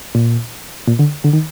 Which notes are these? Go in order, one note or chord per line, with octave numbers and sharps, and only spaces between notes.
A#2
A#2
D3
D3
D#3